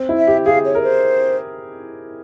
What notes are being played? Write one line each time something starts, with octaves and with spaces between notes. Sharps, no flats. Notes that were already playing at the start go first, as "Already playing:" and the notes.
Already playing: C4
E4
E5
G4
G#4 F5
C#5
A#4
C5